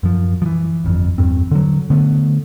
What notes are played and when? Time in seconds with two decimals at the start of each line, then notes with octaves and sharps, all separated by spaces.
0.03 F#2 F3
0.42 E3 F3
0.84 G1 F2
1.18 E2 G2 C4
1.51 D3 F#3
1.90 D3 A3 B3